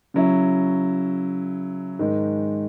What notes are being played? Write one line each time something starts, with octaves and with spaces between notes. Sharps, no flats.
C#3 F#3 C#4 E4
G#2 D#3 G#3